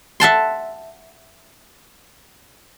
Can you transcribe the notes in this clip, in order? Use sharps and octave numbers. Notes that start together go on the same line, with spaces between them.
E5 F#5 A5 C6